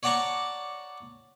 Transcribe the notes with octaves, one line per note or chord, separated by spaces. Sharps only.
C#5 D5 F#5 A5 A#5 C#6